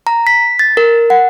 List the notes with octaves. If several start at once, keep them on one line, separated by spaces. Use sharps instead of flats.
A#5
B6
A6
A#4
F#5